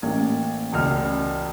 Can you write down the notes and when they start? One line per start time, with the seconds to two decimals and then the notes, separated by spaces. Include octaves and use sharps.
0.02 A1 A#3 G#6
0.73 E1 C#2 F6